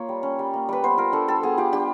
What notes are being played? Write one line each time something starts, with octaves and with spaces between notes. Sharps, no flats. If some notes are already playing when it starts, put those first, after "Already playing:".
Already playing: A#3 F4 C#5
G3
C#4
G3
A#3
G3 B4
B3 C5
F4 A#4
D4 A4
G3 A4
B3 G#4
F4 G4
D4 G4